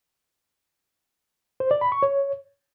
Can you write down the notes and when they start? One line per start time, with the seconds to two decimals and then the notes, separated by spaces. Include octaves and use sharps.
1.60 C5
1.71 D5
1.81 B5
1.92 C#6
2.03 C#5